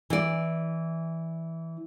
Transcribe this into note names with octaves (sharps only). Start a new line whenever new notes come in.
E3 D5